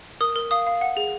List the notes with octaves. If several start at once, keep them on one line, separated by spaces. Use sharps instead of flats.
A#4 D#6
A#4
F5 D#6
F5
F#5
G#4